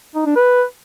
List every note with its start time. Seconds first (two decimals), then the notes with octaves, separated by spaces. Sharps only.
0.15 D#4
0.26 D4
0.36 B4